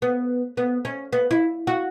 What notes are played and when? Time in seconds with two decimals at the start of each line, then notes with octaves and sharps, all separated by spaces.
0.02 B3
0.57 B3
0.85 C#4
1.13 B3
1.31 E4
1.67 F#4